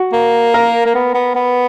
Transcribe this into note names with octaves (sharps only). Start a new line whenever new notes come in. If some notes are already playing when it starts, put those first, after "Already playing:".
Already playing: F#4
A#3
A#4
A#3
B3
B3
B3